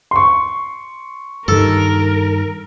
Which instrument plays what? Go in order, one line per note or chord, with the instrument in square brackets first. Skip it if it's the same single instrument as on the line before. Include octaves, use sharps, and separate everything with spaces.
[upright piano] C6 C#6
[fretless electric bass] G2 D#3 [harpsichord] A4 [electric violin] A#4